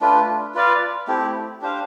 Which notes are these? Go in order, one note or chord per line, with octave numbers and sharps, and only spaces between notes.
A3 D4 F4 B4
F4 B4 D5 F5
A3 C4 E4 G4
D4 G4 C5 F5